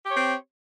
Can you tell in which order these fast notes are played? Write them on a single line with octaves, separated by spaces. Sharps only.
G4 C#5 C4